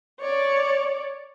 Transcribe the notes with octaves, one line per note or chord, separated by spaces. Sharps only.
C#5 D5